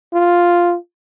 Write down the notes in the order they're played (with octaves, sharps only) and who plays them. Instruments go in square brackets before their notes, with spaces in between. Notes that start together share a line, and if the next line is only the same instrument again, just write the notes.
[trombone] F4